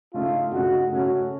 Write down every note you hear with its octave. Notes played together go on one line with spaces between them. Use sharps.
C#3 A3 D#4 F4
C#3 A3 D#4 F#4
C#3 A3 C#4 F#4